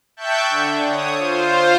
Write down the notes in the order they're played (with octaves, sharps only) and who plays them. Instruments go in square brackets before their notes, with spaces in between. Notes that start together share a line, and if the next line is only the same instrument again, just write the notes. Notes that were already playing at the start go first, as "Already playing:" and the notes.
[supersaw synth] E5 G5 A5 C#6 F#6 G6
D3
C#5 D#6
F4 C5